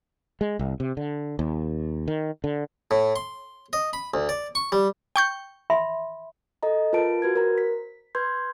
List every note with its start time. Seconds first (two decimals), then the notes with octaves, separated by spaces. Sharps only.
0.41 G#3
0.59 C2
0.80 C3
0.97 D3
1.39 D#2
2.08 D#3
2.44 D3
2.91 A2
3.16 C6
3.73 D#5
3.93 B5
4.14 D2
4.29 D5
4.55 C#6
4.72 G3
5.16 G5 C#6 G6
5.70 E5 B5 C6
6.63 A4 D#5 A#5
6.93 F4 A#4 B4 A5 D7
7.22 F#4 B4 G#6
7.35 A#4 C5 A#5
7.58 B6
8.15 B4 C6 G6 G#6